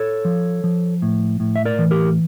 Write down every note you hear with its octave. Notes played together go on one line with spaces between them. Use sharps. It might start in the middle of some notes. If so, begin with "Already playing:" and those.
Already playing: A4 C#5
F3
F3
A2
A2
E5
A#4 D5
E3
G4 A#4